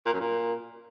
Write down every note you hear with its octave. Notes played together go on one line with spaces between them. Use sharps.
A#2
F#2
A#2